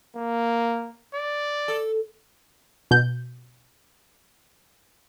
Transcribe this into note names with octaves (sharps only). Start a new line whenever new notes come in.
A#3
D5
A4
B2 G6